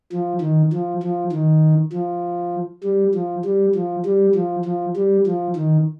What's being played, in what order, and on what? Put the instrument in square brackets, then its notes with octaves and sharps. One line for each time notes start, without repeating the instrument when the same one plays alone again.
[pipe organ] F3
D#3
F3
F3
D#3
F3
G3
F3
G3
F3
G3
F3
F3
G3
F3
D#3